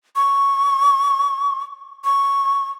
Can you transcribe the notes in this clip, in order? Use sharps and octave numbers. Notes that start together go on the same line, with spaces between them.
C#6
C#6